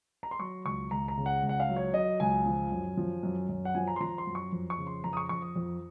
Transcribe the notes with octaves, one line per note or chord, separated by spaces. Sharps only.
A#5
C6
F#3 C#6
C#2 C#6
C#2 A#5
A#5
C#3
F#5
C#2
F#5
F5
F#3
C#5
F#3 D#5
C#2 G#5
F3
F#2
F3
F#2
F#2
F#5
F3 G#5
A#5
C6
F3 A#5
C6
F#2
C#6
F2
C#6
C#3
C6
F2 A#5
D#6
C#6
F2 C#6
D#6
F2